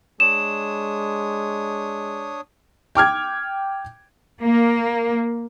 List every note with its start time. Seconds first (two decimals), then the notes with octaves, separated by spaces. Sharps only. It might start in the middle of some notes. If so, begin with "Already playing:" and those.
0.20 G#3 D4 C#5 D#6 E7
2.95 G5 D6 F6 G#6
4.42 A#3